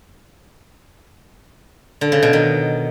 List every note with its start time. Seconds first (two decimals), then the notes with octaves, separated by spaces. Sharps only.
2.01 D3
2.12 C#3
2.22 B2
2.33 D#3